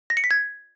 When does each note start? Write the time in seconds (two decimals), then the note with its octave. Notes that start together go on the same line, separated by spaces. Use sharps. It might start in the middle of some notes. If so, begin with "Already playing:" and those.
0.10 A#6
0.17 C#7
0.24 B6
0.31 G#6